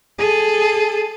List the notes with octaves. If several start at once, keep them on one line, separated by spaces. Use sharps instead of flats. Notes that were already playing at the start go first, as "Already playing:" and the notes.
G#4 A4